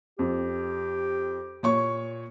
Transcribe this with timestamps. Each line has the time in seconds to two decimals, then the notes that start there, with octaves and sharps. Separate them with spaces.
0.19 F2 G4
1.63 A#2 C#5 C#6